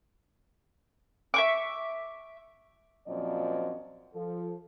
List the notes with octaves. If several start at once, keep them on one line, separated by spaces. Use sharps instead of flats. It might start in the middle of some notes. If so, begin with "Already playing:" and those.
E5 C#6 D6
F#2 A#2 F3 C4 D5 D#5
F3 A4